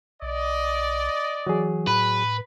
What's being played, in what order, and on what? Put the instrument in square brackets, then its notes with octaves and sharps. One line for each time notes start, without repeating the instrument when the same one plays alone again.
[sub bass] B1 [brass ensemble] D5 D#5
[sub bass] E3 [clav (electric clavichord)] F#3 G#4
[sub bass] A2 [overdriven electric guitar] B4